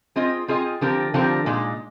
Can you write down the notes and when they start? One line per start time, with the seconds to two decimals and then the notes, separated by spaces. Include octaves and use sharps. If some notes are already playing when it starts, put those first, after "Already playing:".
0.16 C4 F4 G#4 D#5
0.48 C4 F4 G#4 D#5
0.81 D3 F3 C4 G4 A#4
1.14 D3 F3 C4 G4 A#4
1.46 A#2 G#3 D#4